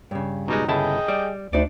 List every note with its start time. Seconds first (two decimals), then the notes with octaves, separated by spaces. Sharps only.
0.11 G2 C#3
0.48 B2 G3 G#3 D#4
0.68 G1 C#3 E4 G#4 D#5 G5 A5
1.08 G3 D5
1.53 D2 D4 D#4 D5